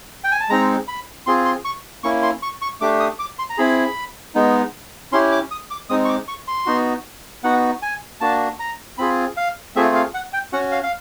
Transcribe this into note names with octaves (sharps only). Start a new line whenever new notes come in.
G5
G#5
A5
G#3 C4 D#4 A#5
B5
C4 F4 G#4 C6
C6
C#6
A#3 C#4 E4 C#6
C6
C#6
C#6
A3 D4 G4 D6
D#6
D6
C6
A#5
C4 E4 G#4 B5
G#3 B3 D#4
C#4 E4 G4 C6
D6
D#6
D6
G#3 C4 D#4 D#6
C#6
D6
C#6
C6
B3 D#4 F#4
B3 D#4 F#4 F#5
G#5
A#3 D4 F#4 A5
A#5
C4 F4 G#4 B5
F5
A3 C4 F4 G#4 E5
F5
F#5
G5
C#4 F#4 F#5
F5
F5